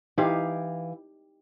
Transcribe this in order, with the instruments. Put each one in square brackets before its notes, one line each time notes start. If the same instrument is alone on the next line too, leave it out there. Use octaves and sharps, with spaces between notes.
[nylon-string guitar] E3 F5 [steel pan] D#4 G4